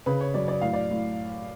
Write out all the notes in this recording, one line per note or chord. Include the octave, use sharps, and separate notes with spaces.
C#3 B4
C#5
F#2 D5
D5
A2 F5
D5
A2